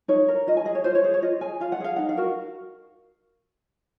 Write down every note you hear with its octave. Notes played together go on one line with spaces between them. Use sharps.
D#4 C#5
A#4
F4 D#5
G#5
G#4 D#5
C#5
F4 C5
C#5
G#4 C5
C#5
F4 D#5
G#4 G#5
F4 F5
F#5
G#4 F5
D#4 F#5
F5
F#4 A#4